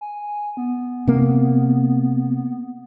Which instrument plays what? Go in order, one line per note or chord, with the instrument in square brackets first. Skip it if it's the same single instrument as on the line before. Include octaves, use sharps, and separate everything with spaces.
[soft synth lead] G#5
B3
[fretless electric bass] C3 A#3